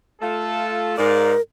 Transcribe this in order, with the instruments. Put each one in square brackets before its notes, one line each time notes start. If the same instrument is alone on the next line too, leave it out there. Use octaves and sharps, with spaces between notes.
[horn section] A3 F4 A4
[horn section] G#2 D5 F5 [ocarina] A#4